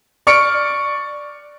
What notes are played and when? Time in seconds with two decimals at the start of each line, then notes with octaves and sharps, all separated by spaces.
0.27 D5 C#6 F6 C#7 D7